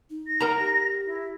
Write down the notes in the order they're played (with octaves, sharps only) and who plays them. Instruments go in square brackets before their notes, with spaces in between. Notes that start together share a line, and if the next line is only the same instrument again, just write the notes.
[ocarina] D#4
[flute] A#6
[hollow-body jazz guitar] A#4 F#5 A#5
[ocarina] G4
[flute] E4